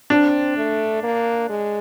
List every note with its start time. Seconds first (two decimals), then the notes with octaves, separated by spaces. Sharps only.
0.10 C4 D4
0.57 A3
1.03 A#3
1.49 G#3